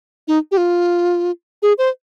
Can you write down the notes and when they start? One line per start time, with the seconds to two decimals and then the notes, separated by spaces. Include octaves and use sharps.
0.28 D#4
0.51 G4
0.57 F4
1.62 G#4
1.78 C5